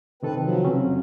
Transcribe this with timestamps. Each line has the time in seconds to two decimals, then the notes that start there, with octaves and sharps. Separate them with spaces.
0.23 C3 D#3 C4 A4 B4
0.40 F3 F#3
0.64 C#3 C4 C#4
0.78 F2